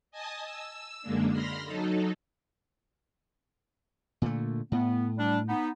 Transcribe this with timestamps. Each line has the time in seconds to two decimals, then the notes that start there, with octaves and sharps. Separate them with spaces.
0.11 D#5 G#5 A5 D#6
0.44 E6
1.02 F#2 D3 G#3 A#3 D4
1.32 B5 C6 F6 A#6
1.65 F#3 D#4 A4
4.22 A#2 D3 A3
4.72 A2 B3
5.18 G3 D4
5.48 B3 D#4